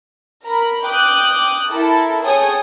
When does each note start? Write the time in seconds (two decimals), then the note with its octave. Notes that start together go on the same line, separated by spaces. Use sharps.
0.43 A#4 B5
0.85 G5 D6 D#6 F#6 G6
1.70 E4 A4 A#4
2.23 G#4 A4 C#5 G5 G#5 D#6